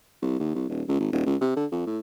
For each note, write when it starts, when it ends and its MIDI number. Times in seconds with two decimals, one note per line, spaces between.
0.22 0.38 36
0.40 0.53 39
0.55 0.68 36
0.69 0.83 27
0.88 0.99 37
1.00 1.09 32
1.12 1.25 27
1.26 1.36 37
1.41 1.53 48
1.56 1.66 50
1.72 1.84 41
1.86 1.99 45